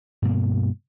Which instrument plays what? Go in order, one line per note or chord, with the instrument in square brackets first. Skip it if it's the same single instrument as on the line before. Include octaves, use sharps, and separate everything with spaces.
[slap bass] G2 B2 A#3